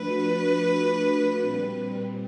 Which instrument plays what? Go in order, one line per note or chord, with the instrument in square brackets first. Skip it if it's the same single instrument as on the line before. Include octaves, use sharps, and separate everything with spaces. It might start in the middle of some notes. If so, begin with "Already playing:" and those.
Already playing: [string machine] F3 A3 D4 F#4 [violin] B4
[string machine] A#2 G3 C4